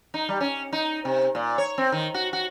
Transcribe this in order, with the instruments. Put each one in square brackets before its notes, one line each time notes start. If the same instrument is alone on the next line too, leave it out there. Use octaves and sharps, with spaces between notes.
[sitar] D#4
G3
C#4
D#4
C3
A#2
C#5
C4
D#3
F#4
F#4